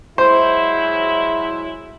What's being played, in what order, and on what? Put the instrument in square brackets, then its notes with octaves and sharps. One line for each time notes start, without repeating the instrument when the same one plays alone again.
[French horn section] F#3 G#3 E4 [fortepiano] C5